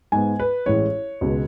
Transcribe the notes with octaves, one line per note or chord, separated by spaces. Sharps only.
G#2 G#3 B3 G#5
B4
A1 A2 G#3 C#5
C#2 B2 G#3